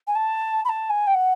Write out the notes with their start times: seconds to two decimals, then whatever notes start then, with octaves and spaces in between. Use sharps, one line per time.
0.07 G#5
0.15 A5
0.65 B5
0.69 A5
0.90 G#5
1.07 G5
1.14 F#5